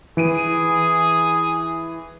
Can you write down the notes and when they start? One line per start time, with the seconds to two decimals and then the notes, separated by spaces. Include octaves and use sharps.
0.17 E3 G#4 D7 D#7